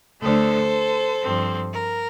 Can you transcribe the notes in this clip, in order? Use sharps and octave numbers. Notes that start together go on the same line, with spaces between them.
D2 D3 A3 A4 C5
G2 F3 C4
A#4